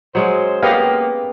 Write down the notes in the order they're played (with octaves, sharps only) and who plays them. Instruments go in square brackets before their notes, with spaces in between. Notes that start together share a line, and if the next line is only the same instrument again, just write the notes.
[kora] F#3 G#3 C#4 [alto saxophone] C5
[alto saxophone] A#3 [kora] B3 [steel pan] G4 D#5 F5 [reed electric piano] B4